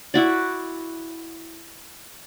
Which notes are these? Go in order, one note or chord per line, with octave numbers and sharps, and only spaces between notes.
E4 F#4 D5